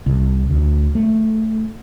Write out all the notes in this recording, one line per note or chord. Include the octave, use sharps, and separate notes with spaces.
C2
D2
A3